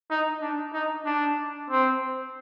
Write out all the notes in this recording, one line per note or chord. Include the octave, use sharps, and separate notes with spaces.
D#4
D4
D#4
D4
C4